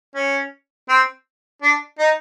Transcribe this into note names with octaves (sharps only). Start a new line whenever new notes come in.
C#4
C4
D4
D#4